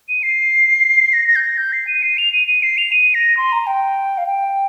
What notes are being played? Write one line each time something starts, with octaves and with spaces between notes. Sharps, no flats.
D#7
C7
A#6
A#6
G6
A#6
G6
C7
D#7
C7
F7
D#7
D#7
C7
F7
D#7
A#6
C6
A#5
G5
F5
G5